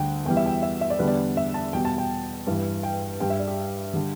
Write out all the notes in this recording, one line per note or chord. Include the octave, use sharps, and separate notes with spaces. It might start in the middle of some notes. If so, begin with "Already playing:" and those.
Already playing: D2 D3 G3 G5
E2 E3 G3 G5
E5
G5
E5
E5
D5
E2 D3 G3 B4
D5
E5
A5
E2 B2 G3 G5
A5
G5
G2 E3 G3
G5
G2 G3 G5
E5
D5
G4
D3 G3